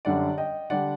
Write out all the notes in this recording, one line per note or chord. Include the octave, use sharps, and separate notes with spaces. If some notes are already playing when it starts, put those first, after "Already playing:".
F#2 D3 G3 D4 D5 F#5
D#5 G5
D3 G3 D4 D5 F#5